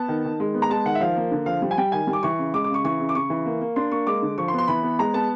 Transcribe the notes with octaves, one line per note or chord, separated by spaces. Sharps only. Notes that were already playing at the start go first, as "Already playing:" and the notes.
Already playing: B3 A5
D#3
D#3
G#3
B3
A#5
G#3 A5
D#3 F#5
E5
F3 F5
A#3
D3
F3 F5
G3
G#5
G3 G5
D#3 G#5
G3
D6
E3 C#6
C#3
G#3 D6
D6
C#3 C#6
E3 C#6
C#3
D6
C#3 C#6
E3
A#3
A#3
D4 C6
A#3 C#6
G#3 D6
D3
F3 C#6
C6
B3
C6
E3 B5
B3
G#3 A#5
B3 A5